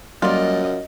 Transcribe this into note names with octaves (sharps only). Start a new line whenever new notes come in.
F#2 F#3 G3 A#3 F4 D5 D#5